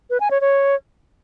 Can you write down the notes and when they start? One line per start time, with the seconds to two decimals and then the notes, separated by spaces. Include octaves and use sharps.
0.10 B4
0.20 G#5
0.31 C#5
0.41 C#5